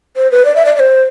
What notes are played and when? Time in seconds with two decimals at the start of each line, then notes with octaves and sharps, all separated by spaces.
0.16 C5
0.32 B4
0.45 D5
0.56 E5
0.65 D5
0.76 D5
0.80 C5